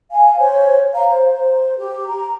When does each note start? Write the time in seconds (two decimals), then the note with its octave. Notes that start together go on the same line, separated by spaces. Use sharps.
0.12 F5 G#5
0.39 C5 C#5
0.94 F5 A#5
1.09 C5
1.79 G4
2.07 A#5